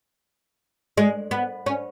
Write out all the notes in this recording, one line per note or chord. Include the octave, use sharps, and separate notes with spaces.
G#3
B3
C#4